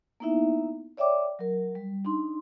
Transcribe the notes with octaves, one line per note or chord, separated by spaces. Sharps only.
A#3 B3 D#4 E4 E5
C#5 D5 E5 G5 D6
F#3 A#4
G3
D4 D#4 C6